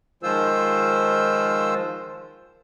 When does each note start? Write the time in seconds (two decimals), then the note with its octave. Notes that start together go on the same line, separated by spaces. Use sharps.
0.23 D#3 F3 G#3 F4 C5 E6